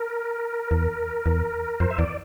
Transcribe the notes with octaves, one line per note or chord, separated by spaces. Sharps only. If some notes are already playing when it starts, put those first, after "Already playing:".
Already playing: A#4
E2
E2
F2 C5
E5
E2 D5